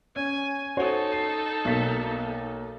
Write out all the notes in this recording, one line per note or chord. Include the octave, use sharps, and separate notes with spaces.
C#4 G#5
D#4 F#4 A4 C5 C#5
C7
B1 A#3 B6